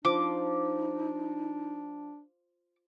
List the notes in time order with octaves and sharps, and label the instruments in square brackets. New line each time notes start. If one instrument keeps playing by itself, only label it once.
[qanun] F3 [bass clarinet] D4 [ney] D#4 [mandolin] D6